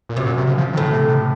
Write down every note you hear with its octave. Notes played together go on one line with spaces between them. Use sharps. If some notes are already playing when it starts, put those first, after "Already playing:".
A#2
F#2 C3
A#2
C3
C#3
F3
D#3
A2 C#3
C3
C3